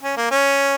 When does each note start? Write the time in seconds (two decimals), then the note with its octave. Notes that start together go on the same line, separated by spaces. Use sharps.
0.03 C#4
0.17 A#3
0.31 C#4